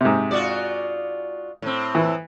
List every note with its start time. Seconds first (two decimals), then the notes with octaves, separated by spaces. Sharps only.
0.01 G#2 C3
0.31 F4 F#4 D5
1.62 A2 C4
1.95 E3